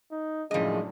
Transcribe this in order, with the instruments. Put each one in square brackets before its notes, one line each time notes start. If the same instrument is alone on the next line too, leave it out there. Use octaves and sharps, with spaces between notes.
[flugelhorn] D#4
[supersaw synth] F#2 A2 C#3 [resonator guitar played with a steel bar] F3 D#5 [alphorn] G#3 [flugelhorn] D4